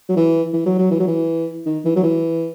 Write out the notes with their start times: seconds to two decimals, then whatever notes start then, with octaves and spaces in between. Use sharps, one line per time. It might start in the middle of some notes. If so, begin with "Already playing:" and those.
0.09 F#3
0.16 E3
0.53 E3
0.66 F#3
0.78 F#3
0.91 E3
0.99 F#3
1.07 E3
1.66 D#3
1.85 E3
1.96 F#3
2.03 E3